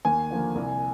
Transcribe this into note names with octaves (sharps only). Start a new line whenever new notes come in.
D#2 G#5
D3 F3 A#3
C2